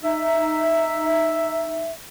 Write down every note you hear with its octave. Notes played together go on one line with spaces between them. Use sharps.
D#4 E5